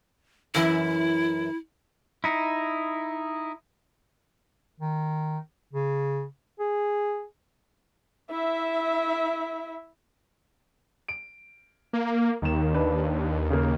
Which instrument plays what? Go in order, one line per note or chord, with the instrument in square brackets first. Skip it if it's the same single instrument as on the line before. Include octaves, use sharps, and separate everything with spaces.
[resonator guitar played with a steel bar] F#2 E3 E5 [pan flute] E4
[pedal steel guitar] D#4 E4
[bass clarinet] D#3
C#3
G#4
[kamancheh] E4 E5
[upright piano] D7
[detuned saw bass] A#3
[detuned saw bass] D#2 [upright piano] D#3 E7
[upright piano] D4 B4
C#3 A#3